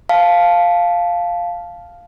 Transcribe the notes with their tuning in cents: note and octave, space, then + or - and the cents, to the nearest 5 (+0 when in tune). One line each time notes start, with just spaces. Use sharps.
F5 +0 A5 -15